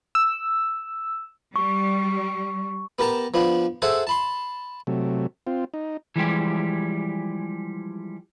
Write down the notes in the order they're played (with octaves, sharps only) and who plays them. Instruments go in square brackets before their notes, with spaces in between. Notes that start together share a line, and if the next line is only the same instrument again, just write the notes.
[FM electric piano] E6
[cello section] G3 [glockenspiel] C#6
[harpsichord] B3 G4 A#4 A5 A#5
F3 B3 D4
G#4 A4 C5 E5 F#5 G#5
A5 B5 C6
[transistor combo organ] C3 F#3 A3
C4 F4
D#4
[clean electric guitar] E3 F3 G3 G#3 G4